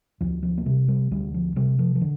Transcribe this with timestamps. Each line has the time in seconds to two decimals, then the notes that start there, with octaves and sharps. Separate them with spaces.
0.21 D2 F3
0.43 F3
0.58 A#3
0.66 C3 G3
0.88 G3
1.11 D2 G3
1.34 F3
1.56 C3 G3
1.79 F3
1.95 F3
2.01 D3